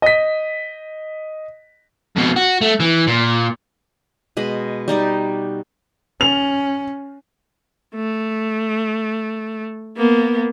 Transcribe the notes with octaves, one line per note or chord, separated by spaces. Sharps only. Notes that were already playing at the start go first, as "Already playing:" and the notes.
D#5 B6
F2 B2
F#4
A3
E3
A#2
B2 G#3 B5
G3 D#4 G4 D5
C#4 F7
A3
A#3 B3